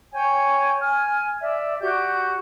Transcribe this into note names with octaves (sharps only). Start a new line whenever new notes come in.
C#5 G5 G#5
G#5 F6
D5 E5
F#4 G4 D5 G6